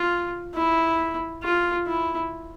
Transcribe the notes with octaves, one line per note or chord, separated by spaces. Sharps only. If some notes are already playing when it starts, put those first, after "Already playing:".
Already playing: F4
E4
F4
E4